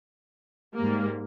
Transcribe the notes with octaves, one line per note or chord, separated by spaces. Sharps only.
G#2 G3 A#3